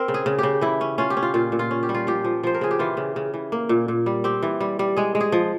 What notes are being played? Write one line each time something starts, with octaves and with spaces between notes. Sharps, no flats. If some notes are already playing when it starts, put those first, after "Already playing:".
Already playing: C4 A#4
C#3
G#4
C#3
C#3 G4
E3 E4
C#4
C#4 F4
G4
C#4
F4
A#2 F4
A#2
F4
C#4
G4
G3
F4
F3 G4
F3
F3 C5
A#4
C#3 G#4
G4
E3 F4
C#3
C#3
E3
A#3
A#2
A#2
G3
C4 G4
E3
G3
G3
G#3 G#4
G#3
G#4
F3